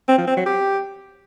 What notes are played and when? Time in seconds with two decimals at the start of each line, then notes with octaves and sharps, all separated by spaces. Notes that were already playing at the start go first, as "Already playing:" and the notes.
0.09 C4
0.18 F3
0.27 C4
0.37 F#3
0.46 G4